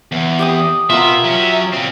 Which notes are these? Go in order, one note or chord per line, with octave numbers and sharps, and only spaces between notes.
E2
G4 G5 D#6
B2 B3 F4 A#4 E5
F#3 C#4
A#2 C4